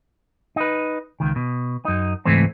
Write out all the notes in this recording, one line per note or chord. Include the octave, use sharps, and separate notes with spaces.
D#4 B4
C#2 D#3
B2
F#2 D#4
C#2 G#2 E3 A3 C4